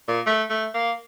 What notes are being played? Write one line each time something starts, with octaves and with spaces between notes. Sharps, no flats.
A#2
A3
A3
A#3